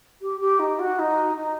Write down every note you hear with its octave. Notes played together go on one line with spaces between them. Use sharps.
G4
G4
D#4
F#4
D#4
D#4